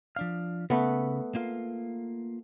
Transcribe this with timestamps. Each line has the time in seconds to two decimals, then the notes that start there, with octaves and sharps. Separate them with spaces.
0.16 F3 D4 F5
0.70 C#3 A3 B3 B5
1.35 A#3 F4 F5